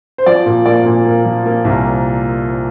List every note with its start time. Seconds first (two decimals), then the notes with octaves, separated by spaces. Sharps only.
0.18 C5
0.26 F3 D5
0.46 A#2
0.66 A#3 D5
0.85 A#2
1.05 A#3
1.25 F3
1.46 A#3
1.65 C2